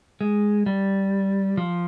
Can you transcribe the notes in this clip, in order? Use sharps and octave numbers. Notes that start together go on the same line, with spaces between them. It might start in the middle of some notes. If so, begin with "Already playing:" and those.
G#3
G3
F3